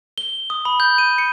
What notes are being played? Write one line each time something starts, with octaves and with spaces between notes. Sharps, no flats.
G7
D#6
B5
G6
D#7
C#7